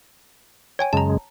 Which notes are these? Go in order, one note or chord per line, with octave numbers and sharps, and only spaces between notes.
C#5 G5 G#5
F#2 C#3 G#3 A5 A#5